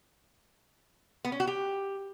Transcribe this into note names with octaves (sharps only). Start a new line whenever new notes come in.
B3
C#4
F#4
G4